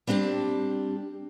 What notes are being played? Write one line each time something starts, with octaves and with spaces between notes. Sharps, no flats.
G3 C4 D4 G4 A5